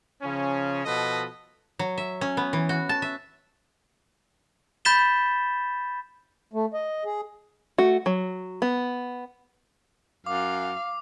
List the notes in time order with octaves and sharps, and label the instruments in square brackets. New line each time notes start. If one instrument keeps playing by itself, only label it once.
[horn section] C#3 F3 C#4
B2 F3 A4 B4 D#5
[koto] F#3
E5
C#4
B3
E3
F#4
A5
E5
[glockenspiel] B5 G6 A6 B6 E7 G7
[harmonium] A3
D#5
G#4
[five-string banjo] A3 F#4
F#3
B3
[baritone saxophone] F#2 [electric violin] F5 [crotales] D6